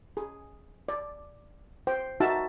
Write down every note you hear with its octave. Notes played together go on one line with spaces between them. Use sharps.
G#4
D5
C5 G5
D#4 F#4 E5 A5